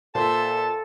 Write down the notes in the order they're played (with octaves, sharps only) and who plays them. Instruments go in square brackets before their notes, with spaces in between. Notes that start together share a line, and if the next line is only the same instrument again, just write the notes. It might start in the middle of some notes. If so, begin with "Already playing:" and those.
[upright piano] A#2 [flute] A4 [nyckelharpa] C5 E5 [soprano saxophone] A5